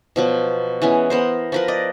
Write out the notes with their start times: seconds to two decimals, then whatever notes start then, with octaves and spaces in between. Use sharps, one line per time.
0.16 B2 F3 F#3
0.82 E3 G#3 B3 C#4
1.10 B3 A#4 C5
1.52 F3 A#4 B4
1.68 D5 D#5